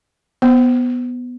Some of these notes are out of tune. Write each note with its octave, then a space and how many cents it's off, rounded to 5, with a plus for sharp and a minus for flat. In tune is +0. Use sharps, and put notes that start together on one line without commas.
B3 +0 C5 +0